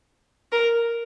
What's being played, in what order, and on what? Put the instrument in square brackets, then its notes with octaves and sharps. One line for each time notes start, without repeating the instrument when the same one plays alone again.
[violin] A#4